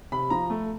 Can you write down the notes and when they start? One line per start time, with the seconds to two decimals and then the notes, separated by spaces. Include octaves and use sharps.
0.12 C3 B5
0.30 F3 A#5
0.50 A3